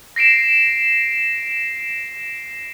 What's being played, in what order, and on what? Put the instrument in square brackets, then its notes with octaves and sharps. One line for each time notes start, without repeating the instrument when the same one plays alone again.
[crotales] A#6 C7 D7 E7